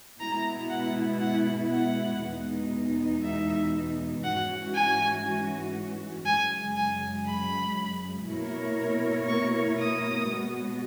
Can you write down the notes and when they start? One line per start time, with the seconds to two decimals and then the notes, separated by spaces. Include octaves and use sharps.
0.20 B2 G#3 B3 E4 A#5
0.70 F#5
1.20 F#5
1.72 F#5
2.21 E2 B2 G#3 B3 D#4
3.23 E5
4.24 G#2 E3 G#3 C#4 F#4 F#5
4.74 G#5
6.26 F#2 C#3 G#3 G#5
6.76 G#5
7.27 B5
8.27 B2 A#3 E4 A#4 C#5
9.29 C#6
9.79 D#6
10.30 B2 G#3 B3 F#4